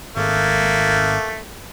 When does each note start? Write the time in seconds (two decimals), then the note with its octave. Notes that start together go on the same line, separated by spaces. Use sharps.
0.17 G#1 A3 A#3